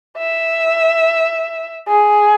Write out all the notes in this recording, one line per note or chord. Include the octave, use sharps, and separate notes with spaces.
E5
G#4